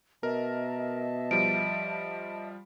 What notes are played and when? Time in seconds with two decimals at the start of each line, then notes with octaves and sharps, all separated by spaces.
0.23 B2 A#4 D#5 E5 A5
1.31 F3 G3 D7